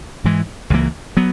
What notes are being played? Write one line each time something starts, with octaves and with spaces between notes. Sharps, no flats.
G#2 E3 G#3
C#2 C#3 E3 A#3
F#3 B3